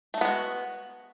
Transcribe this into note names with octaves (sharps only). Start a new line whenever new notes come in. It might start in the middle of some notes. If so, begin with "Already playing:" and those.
G#3 A3 B3 D#4 F#4